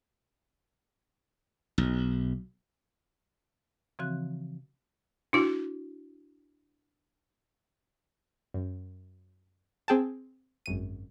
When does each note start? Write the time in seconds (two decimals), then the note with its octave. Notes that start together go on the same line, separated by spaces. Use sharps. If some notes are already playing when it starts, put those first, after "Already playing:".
1.78 B1
3.99 C#3 E3 F3 C4 F#4 F#6
5.33 D4 E4 F#4
8.54 F#2
9.88 C4 G#4 G5 A5
10.66 G#1 F#2 D#7